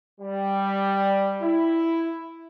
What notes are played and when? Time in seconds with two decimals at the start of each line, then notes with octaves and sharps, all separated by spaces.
0.21 G3
1.43 E4